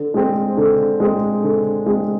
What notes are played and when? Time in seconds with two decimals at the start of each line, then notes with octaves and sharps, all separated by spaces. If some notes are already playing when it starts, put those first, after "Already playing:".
Already playing: D3
0.14 G#3 C4
0.57 D3
1.00 G#3 C4
1.44 D3
1.86 G#3 C4